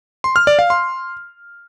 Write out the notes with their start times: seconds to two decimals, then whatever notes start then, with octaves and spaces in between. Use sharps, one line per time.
0.24 C6
0.36 F6
0.47 D5
0.59 F5
0.70 C6